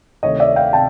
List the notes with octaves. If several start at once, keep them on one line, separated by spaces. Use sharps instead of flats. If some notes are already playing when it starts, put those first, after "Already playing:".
D2 C3 D#3 C#5 D#5
D5 E5
F5 G5
C3 G5 A5